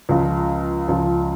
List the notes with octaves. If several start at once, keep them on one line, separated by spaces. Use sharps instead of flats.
C#2 C#3 F3
C#2 C#3 F3